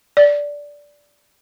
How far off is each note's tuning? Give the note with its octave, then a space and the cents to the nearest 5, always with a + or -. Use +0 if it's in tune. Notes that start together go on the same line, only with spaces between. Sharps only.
D5 -10